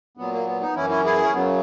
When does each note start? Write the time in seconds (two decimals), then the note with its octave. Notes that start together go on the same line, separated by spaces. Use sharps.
0.17 A#2 F#3 B3
0.33 A#3
0.46 B3
0.61 B3 D#4
0.75 F#2 E3 C#4 E4
0.90 C#4 E4
1.05 E4 G#4
1.24 C#4
1.33 F#2 C#3 F#3 B3